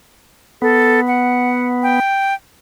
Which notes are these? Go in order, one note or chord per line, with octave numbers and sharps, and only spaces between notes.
B3 A4
F#5
G5